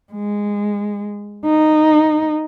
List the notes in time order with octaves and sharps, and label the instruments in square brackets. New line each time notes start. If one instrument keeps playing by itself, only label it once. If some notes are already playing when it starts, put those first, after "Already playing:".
[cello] G#3
D#4